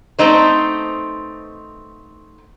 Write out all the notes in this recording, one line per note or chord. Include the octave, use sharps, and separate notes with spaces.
A3 B3 C4 D#4 C5